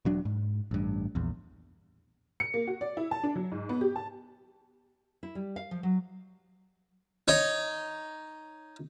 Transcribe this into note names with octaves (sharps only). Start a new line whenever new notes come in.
E1 F#3 D4
G#2
A1 G2
A#1 E2
C#7
A#3
F#4
D5
E4
A5
D4
F#3
G#2
B3
G4
A5
E4
G3
F5
F3
F#3
D#4 C#5 D#5